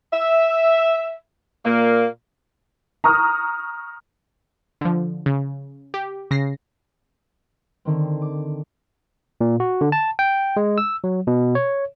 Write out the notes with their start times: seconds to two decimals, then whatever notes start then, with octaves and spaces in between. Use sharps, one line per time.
0.12 E5
1.65 A#2 A#3
3.04 A#5 C#6 D#6 F6
4.81 D3 F3
5.26 C#3
5.94 G4
6.31 C#3 A#6 C7
7.85 D3 D#3 C4
8.22 D6
9.41 A#2
9.60 F#4
9.81 D3
9.92 A5
10.19 G5
10.57 G#3
10.78 E6
11.04 F#3
11.27 B2
11.55 C#5